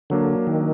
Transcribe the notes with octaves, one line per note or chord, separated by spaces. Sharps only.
D3 F#3 A#3 D4
D#3